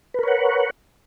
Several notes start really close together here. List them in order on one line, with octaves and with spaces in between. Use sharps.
B4 A#4 C#5 F#5